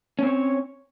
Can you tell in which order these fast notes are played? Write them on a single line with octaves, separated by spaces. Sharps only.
C#4 C4 C#5